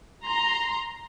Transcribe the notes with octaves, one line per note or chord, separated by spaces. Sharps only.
A#5 C6